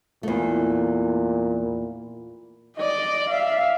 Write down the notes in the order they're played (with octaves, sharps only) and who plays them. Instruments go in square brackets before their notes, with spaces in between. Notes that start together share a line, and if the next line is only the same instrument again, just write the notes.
[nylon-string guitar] E2 A3 [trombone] A#2
[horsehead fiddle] D5 D#5
E5 F5